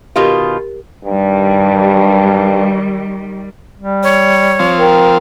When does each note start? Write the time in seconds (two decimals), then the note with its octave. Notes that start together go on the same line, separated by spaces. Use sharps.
0.16 B2 D#3 F4 G4 A#4
1.04 G2 D#3 G3
3.77 G3
4.03 C#5
4.59 F3 C4
4.79 A#4 G5